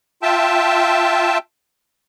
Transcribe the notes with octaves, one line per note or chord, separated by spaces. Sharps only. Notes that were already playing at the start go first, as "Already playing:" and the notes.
F4 E5 G5 A5